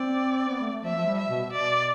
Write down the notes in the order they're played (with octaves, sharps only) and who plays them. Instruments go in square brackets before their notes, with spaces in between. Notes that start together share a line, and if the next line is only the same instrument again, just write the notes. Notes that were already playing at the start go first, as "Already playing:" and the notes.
Already playing: [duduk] C4 [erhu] D5
[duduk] B3
A3
A3
[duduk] F3 [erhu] E5
[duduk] F3
G3
[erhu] E5
[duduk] B2
[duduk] B2 [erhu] D5